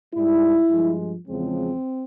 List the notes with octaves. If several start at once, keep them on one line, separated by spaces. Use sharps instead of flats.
G#2 G3 E4
G2 F3 G#3
E2 C#3 F3 G#3 C4